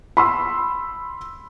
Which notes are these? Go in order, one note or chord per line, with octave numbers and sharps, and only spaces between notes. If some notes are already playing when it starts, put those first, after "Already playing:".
B5 C6 E6